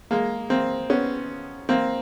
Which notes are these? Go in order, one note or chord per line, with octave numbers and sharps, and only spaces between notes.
G#3 A#3
A#3 C4
B3 C#4
A#3 C4